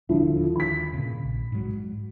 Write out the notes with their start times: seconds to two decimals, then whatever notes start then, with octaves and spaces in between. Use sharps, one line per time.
0.09 D#1 D3 F3 F#3 E4
0.37 D#2
0.56 B5 B6
0.93 A#2 C#3
1.24 A#1
1.52 G#2 F#3